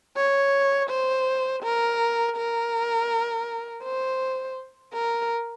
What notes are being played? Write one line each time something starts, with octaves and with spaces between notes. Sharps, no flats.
C#5
C5
A#4
A#4
C5
A#4